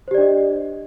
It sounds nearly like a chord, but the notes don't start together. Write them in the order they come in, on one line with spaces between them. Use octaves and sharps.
C5 G4 D5 D4 D#5